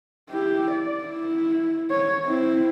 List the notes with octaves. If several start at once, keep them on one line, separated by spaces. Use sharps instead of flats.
E4 G4
D5
E4
C#5
C4 E4